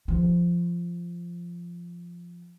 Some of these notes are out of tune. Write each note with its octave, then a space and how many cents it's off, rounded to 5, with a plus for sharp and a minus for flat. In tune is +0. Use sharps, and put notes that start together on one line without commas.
F3 -10